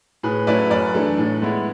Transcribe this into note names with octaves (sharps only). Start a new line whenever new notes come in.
A2 G#4 B4
F#3 A3 C#4 E4 B4 D5
F#2 B4 D5
E3 A3 D4
A2
G#3 B3 E4